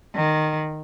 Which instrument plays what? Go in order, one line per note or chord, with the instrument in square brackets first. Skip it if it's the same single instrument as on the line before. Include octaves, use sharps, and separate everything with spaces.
[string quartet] D#3